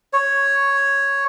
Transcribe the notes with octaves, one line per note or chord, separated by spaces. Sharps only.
C#5